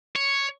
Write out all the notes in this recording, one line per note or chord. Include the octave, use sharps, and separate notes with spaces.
C#5